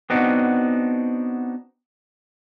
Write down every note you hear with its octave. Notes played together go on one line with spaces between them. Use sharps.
B3 C4 D4 D#4 F#4